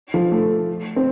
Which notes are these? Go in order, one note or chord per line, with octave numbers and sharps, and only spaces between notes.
F3
A3
C4